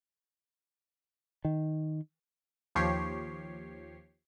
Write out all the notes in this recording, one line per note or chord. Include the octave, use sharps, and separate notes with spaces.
D#3
D#2 F3 G4 C#5 C7